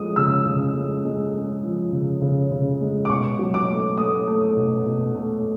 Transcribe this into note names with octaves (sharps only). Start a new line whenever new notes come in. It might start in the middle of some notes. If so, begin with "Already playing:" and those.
Already playing: F3 G#3 D#6
C#3 E6
C#3
G#3
G#3
G#3
F3
C#3
C#3
C#3
G#3
D6
B2 C#6
F#3
D6
A3
A3 D#6
A3
B2
B2
A3